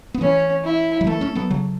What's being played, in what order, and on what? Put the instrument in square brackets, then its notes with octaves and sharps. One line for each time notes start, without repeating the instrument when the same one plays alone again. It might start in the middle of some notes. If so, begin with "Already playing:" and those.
[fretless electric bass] B3
[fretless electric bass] E3 A3 [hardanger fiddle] C#4
[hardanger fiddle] E4
[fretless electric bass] F#3
[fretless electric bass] E3 A3 [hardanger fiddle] A4
[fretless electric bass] A3 C#4
F#3 B3
C#3 F#3